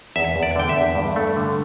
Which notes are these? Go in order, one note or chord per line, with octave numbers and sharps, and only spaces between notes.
E2 E5
E2
D5
D3 G5
E5
E2
G2
A3
D3